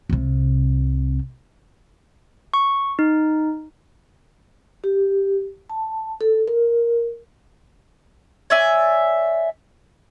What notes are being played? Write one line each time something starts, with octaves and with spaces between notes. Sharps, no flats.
C2 C3
C#6
D#4
G4
A5
A4
A#4
C#5 D5 E5 G#5